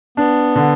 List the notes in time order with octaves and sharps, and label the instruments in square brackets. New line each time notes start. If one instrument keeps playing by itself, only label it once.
[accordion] B3 [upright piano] D4
[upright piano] D3